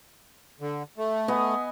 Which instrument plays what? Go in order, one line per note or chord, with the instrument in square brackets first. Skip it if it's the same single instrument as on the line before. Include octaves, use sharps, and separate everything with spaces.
[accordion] D3
A3
[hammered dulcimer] B3 D#5 G#5